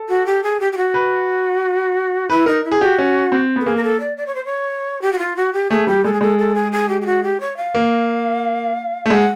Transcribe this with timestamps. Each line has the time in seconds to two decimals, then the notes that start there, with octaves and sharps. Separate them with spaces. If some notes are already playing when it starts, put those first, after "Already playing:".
Already playing: A4
0.09 F#4
0.26 G4
0.43 G#4
0.60 G4
0.72 G4
0.77 F#4
0.94 B4
2.30 E4 B4
2.46 D#4 A#4
2.64 E4
2.72 G#4
2.81 F#4 G4
2.98 C#4
3.32 C4
3.56 B3 A4
3.65 A#3 G#4
3.77 A#4
3.83 A4
4.00 D5
4.17 D5
4.26 C#5
4.35 C5
4.45 C#5
5.02 G4
5.12 F#4
5.18 F4
5.36 F#4
5.53 G4
5.70 A3 G#4
5.87 G3 G4
6.04 G#3 A4
6.13 G#4
6.21 G#3 A4
6.39 A4
6.55 G#4
6.72 G#4
6.89 G4
7.01 G4
7.06 F#4
7.23 G4
7.40 C#5
7.57 F5
7.75 A#3
9.06 A3
9.10 G#3 F#5